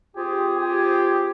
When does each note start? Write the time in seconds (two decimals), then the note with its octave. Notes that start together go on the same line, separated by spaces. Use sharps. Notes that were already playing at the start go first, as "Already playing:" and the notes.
0.16 C4 F4 G4 G#4
0.57 G4